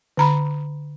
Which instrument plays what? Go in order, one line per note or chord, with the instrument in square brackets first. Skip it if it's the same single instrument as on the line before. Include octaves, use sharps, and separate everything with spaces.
[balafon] D3 A#5 B5